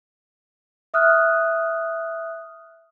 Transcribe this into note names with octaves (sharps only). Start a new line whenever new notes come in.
E5 D#6 F6 F#6